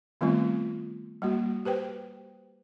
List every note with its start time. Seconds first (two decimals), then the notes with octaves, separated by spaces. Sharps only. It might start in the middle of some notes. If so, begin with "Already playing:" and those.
0.21 D#3 G3 A3 B3 C4 F4
1.22 G3 A#3 F#4
1.65 G4 B4 C5 G5